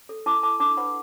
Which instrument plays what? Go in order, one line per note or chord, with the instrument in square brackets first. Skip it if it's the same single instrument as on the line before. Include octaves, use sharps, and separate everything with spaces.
[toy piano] A4
E4 A5 D6
A4 A5 D6
D4 A5 D6
B4 F#5 B5